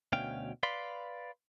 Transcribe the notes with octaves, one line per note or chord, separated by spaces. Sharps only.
D2 B2 C#4 F5 G5
B4 D5 F5 B5 C6